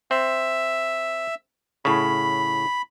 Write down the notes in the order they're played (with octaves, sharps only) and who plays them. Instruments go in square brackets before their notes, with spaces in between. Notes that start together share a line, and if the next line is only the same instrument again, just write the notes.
[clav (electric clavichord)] C4 [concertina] E5
[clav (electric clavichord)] A2 C#3 [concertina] B5